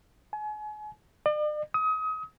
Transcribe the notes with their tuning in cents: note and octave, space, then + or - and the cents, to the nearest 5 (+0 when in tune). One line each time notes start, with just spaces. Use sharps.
G#5 +35
D5 +45
D#6 +30